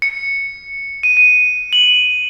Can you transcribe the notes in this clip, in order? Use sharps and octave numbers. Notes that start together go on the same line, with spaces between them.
C#7
D#7
D#7
F#7